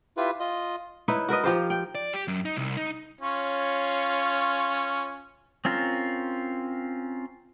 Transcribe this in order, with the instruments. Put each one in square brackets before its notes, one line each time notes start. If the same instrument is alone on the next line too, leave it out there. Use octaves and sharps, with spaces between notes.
[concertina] E4 F4 G4 B4
F4 D#5
[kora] D#4 E4 B4 C#5
F#4 A#4 B4 D#5
F3 F4 G4 C5
G5
[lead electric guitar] D5
G4
F#2
D#4
C2
D#4
[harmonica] C#4 F4 C#5
[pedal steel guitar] C4 C#4 F4 A#4